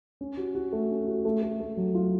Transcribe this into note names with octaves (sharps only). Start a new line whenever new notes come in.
C#4
F#4
F#4
A3
C#4
F#4
A3
A3
A3
F#3
F4